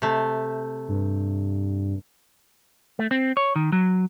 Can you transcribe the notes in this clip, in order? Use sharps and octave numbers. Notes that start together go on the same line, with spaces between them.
C3 A3
G2
A3
C4
C#5
D#3
F#3